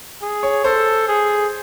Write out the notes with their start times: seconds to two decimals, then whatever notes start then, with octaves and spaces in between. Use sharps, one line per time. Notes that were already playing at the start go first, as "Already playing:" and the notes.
0.22 G#4
0.43 C#5
0.64 A4 C5
1.08 G#4